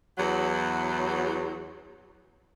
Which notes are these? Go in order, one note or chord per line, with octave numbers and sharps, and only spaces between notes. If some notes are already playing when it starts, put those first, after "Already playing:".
E2 F#3